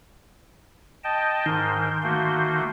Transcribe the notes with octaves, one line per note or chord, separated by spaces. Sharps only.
D#5 G5 A5
G#2 D#3 A#4 C6 G6
A3 A#3 F#4